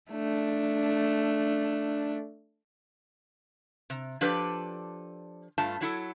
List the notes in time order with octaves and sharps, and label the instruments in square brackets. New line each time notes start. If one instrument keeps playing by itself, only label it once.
[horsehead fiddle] A3 D4
[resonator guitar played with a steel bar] C3
F3 D4 G4 A4 B4 D5
G2 A3 F4 A5
F#3 E4 A4